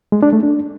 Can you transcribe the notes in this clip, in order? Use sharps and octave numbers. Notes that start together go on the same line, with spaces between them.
G#3
D4
A3
D4